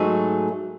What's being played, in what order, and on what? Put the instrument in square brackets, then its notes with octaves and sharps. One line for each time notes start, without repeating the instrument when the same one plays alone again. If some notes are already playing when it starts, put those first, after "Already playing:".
Already playing: [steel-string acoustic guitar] G#2 F#3 A3 D#4 G#4